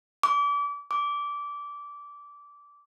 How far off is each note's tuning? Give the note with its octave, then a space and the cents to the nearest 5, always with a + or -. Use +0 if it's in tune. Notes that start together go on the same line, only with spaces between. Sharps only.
D6 -30
D6 -15